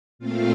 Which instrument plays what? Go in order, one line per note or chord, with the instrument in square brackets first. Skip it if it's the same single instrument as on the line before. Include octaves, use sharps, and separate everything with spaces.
[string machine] A#2 A3 C4 F4 F5